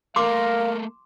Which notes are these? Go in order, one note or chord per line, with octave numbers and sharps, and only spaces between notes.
A3 A#3 A#4 F5 C6 D6